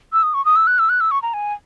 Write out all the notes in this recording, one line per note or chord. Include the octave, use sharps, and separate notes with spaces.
E6
D#6
C#6
D#6
E6
F#6
E6
F#6
E6
C#6
A#5
G#5